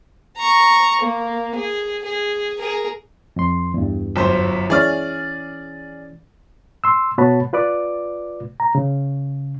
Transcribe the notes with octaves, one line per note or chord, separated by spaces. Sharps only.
A#5 C#6
A#3
G#4
G#4
G#4 A#4
F2 C6
E2 G2
G1 F#2 C5
E3 C#4 G#4 D5 F6
C6 E6
B2 B3 F#4 C#5 A5 B5
F4 B4 D5 D6
A#5
C#3